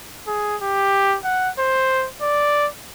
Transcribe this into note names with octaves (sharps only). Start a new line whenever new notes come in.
G#4
G4
F#5
C5
D5